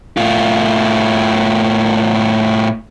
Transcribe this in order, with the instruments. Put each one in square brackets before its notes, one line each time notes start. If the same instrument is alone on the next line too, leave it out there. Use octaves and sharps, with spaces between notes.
[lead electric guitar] A2 F4